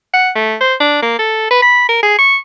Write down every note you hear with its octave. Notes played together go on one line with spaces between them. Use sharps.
F#5
A3
C5
D4
A#3
A4
B4
B5
A#4
G#4
C#6